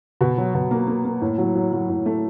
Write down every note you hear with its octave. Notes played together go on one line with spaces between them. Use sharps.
B2
F#3
B2
A#3
A#3
A#3
A2
F#3
F#3
F#3
A2
A3